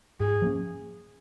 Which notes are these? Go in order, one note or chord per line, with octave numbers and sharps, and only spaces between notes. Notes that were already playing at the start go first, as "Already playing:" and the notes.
G#2 G#4
F3 A#3 C#4